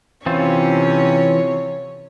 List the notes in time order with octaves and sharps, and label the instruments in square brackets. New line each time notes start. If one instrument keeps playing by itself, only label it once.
[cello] C3 C#4 [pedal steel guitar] E3 C4 F4 [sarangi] C#5